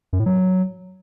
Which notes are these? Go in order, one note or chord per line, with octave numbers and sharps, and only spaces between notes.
F#2
A2
F#3